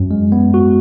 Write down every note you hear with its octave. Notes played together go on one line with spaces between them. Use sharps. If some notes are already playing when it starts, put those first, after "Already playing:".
Already playing: F#2
G#3
B3
F#4